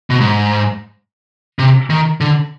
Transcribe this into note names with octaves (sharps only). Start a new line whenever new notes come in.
B2
G#2
C3
D#3
D3